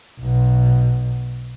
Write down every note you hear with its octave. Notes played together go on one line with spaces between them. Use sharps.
B1 B2